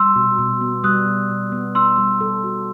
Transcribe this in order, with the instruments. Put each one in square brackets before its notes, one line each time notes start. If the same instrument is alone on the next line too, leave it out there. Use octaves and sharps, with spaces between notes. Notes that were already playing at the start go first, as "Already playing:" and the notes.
Already playing: [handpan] G3 [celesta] C6 E6
[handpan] B2
B2
B3
[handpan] G3 [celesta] D#6 F#6
[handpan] B2
B2
B3
[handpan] D#4 [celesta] C6 E6
[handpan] G3
A4
F#4